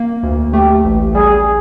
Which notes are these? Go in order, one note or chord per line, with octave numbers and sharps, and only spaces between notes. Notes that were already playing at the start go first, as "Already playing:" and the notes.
Already playing: A#3
D2
A3 G4
A1
G3 G#4